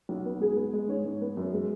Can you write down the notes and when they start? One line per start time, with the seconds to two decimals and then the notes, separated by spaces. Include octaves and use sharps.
0.09 B1
0.17 F#4
0.25 B3
0.41 G#2 G#4
0.56 B3
0.73 G#3
0.89 G#2 C#5
1.05 G#2
1.21 B3
1.37 F#2
1.52 G#3